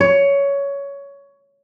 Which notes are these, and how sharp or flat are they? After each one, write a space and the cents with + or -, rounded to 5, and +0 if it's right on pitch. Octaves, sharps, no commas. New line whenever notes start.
C#5 +15